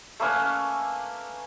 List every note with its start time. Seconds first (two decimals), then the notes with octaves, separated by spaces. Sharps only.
0.20 A3 A#3 C#4 B4